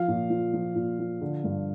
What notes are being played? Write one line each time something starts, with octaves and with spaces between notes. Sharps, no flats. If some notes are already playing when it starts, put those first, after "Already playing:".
Already playing: F3 F5
A#2
F3
F3
A#2
F3
D3
G2